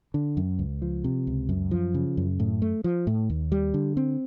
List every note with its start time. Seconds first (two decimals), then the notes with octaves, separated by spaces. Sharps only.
0.14 D3
0.37 F#2
0.59 C#2
0.82 F3
1.04 C3
1.27 C#2
1.49 F#2
1.71 F3
1.94 C#3
2.17 F#2
2.40 A2
2.62 A3
2.84 F3
3.07 A2
3.30 D#2
3.52 G3
3.74 D3
3.97 C4